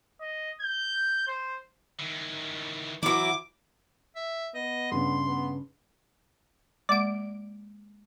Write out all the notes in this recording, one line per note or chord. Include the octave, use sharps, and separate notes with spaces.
D#5
G6
C5
D#3 E3
E3 F#3 E4 D6
E5
B3 D#5
G2 C#3 C6
B3
G#3 A#3 D5 D7